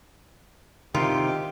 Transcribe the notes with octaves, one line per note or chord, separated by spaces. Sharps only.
C3 D#3 D#4 F4 G4